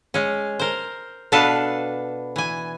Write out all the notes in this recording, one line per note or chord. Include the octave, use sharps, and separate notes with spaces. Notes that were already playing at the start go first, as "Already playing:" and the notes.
G#3 C#4
A#4 C5
B2 D4 A4 B4 F5 A5
E3 G#5